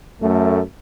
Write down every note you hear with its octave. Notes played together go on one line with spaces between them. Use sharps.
F#2 A3